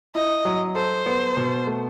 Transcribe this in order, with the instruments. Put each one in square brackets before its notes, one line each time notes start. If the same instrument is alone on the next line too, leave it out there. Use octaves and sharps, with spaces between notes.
[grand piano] E4 [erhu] D#5
[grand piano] F#3
[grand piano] A4 [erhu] C5
[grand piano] B3
B2
A3